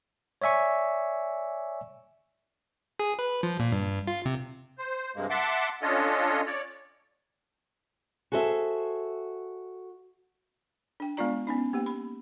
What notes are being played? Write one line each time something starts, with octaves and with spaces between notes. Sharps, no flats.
C#5 D5 E5 G#5 C#6
G#4
B4
F3
A#2
G2
F4
C3
C5
G2 C3 G#3 A#3
E5 F#5 A5 C6 D6
C#4 D4 F4 A4 C#5 D#5
C#5 D5
F#4 G#4 A4 C5 E5
D4 G5
G#3 B3 D4 F4 D5 A#5
B3 C#4 D#4
A#3 G4 F#5
B5